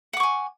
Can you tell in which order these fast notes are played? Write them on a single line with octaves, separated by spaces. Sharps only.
F#5 D6 C#6 G#5